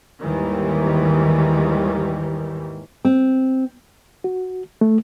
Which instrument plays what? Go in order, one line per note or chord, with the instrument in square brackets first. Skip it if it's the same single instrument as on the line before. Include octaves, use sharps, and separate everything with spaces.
[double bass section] D#2 G#2 D#3 E3 G3
[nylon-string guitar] C4
[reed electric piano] F#4
A3